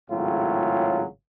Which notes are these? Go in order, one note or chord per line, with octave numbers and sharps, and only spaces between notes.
G#1 A2 C#3 F#3 F4